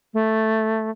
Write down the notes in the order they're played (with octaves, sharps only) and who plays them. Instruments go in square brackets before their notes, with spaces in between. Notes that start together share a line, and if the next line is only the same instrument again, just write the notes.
[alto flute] A3